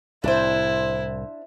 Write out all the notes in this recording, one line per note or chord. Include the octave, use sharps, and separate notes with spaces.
C2 A2 C3 D4 E4 C5